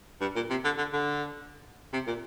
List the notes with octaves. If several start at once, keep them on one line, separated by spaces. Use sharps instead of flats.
G2
A#2
C3
D3
D3
D3
C3
A#2